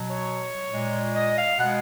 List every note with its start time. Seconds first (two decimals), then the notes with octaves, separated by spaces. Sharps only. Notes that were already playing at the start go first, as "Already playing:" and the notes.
Already playing: B2 F#3
0.09 C#5
0.69 A#2 G#3
1.14 D#5
1.36 F5
1.59 B2 G#3 F#5